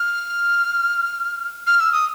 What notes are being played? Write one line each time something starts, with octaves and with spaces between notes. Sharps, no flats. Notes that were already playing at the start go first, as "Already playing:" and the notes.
Already playing: F6
F6
E6
D#6